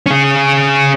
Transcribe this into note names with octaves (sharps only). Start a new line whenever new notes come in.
C#4 G#4